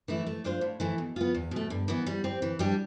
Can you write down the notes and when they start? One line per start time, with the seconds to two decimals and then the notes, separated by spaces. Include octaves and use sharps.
0.08 E3 A3 E4
0.26 A3
0.44 D4 F4 C5 F5
0.61 A2
0.80 E3 A3 E4
0.98 B2
1.16 B3 F4
1.35 E2
1.51 B2 A3
1.70 G2
1.88 E3 B3
2.06 G3
2.24 C4 G4
2.42 E3
2.59 G3 D4 G4